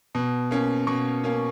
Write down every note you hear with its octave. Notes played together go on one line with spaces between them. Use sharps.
B2
A#3 C#4
B2 C#6
A#3 C#4